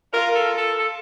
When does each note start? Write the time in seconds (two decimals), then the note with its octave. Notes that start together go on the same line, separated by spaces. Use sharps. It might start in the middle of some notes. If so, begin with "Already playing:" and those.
0.13 F4 A#4
0.35 A4
0.57 A4
0.79 A4